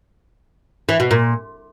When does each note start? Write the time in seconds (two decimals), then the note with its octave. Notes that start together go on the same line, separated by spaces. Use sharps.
0.89 E3
1.00 B2
1.11 A#2